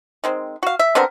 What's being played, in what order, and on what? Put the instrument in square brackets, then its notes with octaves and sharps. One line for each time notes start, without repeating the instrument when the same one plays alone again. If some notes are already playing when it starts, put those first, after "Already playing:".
[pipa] D#3 G#3 C4
F#4 F5
E5
D3 B3 C4 A#4